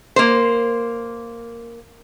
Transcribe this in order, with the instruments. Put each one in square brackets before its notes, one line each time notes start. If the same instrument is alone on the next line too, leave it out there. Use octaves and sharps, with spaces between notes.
[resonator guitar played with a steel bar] A#3 C5